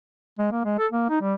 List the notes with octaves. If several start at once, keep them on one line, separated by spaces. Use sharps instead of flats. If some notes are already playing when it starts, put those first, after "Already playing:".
G#3
A#3
G#3
A4
A#3
D#4
G3